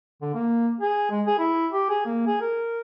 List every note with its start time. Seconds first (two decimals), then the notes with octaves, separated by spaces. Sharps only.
0.21 D3
0.34 A#3
0.81 G#4
1.11 G#3
1.27 G#4
1.39 E4
1.72 G4
1.89 G#4
2.06 A#3
2.27 G#4
2.41 A#4